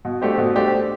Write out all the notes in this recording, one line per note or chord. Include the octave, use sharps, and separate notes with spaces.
B2
A3 D4 G4 C5
B2
A3 D4 G4 C5